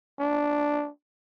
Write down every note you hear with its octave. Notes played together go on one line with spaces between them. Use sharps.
D4